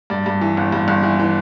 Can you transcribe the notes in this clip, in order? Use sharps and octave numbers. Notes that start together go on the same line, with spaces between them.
G2 D5
G2
E3
G1
G2
G1
E3
E3